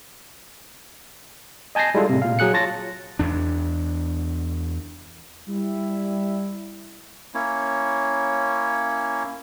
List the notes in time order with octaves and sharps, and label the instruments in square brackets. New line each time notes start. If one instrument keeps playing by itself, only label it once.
[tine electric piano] D#5 G#5 A5 G6 A#6 C7
G3 G#3 E4 F4 A4
A2 C3
A#2 F5
F#3 G#4 F#6 C#7
F4 C#5 A5 A6 A#6
[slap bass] E2 D4
[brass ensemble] G3 E4
[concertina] A#3 C#4 E4 C#5